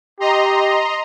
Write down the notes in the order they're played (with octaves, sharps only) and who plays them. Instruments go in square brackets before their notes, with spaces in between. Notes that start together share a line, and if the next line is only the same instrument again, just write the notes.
[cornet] G4 [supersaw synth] D#5 A#5 C6